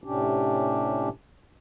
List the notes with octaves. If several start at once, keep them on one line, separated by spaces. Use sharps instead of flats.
A2 C3 C#4 D4 G4